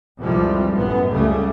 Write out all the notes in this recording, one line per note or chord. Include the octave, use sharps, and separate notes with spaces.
C2 F2 G#2 E3 F3 G3
A1 F#2 B3
C#2 C#3 G3 A3